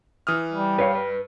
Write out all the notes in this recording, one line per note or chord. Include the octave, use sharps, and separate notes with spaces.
E3 D#6 F6
G3
G2 B4 C#5 F5
B4